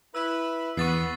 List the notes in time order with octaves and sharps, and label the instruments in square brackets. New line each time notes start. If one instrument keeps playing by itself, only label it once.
[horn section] E4 B4 [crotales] E6
[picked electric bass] E2 [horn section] B3 [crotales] C#6 A6 C7